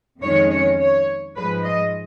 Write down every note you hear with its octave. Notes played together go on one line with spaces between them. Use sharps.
F2 D#3 G#3 C#4 C#5
C#5
C#5
G#2 F3 G#3 B4
D#5